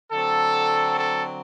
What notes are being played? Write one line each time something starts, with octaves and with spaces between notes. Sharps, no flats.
D3 F#3 C4 A4
A4